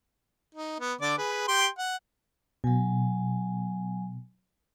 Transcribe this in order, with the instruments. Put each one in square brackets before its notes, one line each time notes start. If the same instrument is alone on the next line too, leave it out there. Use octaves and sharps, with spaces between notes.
[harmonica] D#4
B3
D3 D5 D6
G#4 B4
G4 G5 C6
F#5
[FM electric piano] B2 [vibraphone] F#3 G#5